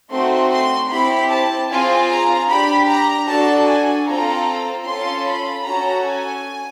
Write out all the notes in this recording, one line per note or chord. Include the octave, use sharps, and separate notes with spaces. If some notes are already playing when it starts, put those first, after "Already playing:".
A3 C4 D#4 F#4 C6
C6
C4 E4 G4 B5
A5
C4 F4 G#4 G#5
A#5
D4 G4 B5
A#5
D4 F#4 A4 A5
G#5
C4 F4 A4 A#5
C#4 F4 A4 C6
B5
C#4 F#4 A4 A#5
G#5